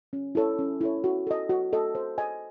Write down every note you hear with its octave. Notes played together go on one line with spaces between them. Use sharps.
C#4
E4 A4 C#5
C#4
E4 A4 C#5
F#4
A4 D#5
F#4
A4 D#5
C5
D#5 G#5